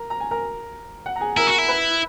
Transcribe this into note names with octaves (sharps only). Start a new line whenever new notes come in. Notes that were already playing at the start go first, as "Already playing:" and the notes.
Already playing: A#4 A#5
A#5
G#5
A#4 A#5
F#5
A#5
G#4 G#5
E4 A#4 A#5
F#4
E4
B4 B5